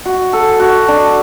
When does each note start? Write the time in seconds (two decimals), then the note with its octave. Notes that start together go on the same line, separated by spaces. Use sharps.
0.05 F#4
0.33 A4
0.60 F#4
0.88 D4